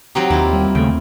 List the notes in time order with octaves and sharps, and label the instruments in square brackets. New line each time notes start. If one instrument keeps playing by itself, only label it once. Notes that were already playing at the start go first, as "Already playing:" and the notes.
[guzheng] F#3 C4 D#4 [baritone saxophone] G4
[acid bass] D#2 [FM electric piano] D#3 [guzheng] E4 F4
[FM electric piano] G3
[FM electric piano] D#2 A3 [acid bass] C#3 [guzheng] G5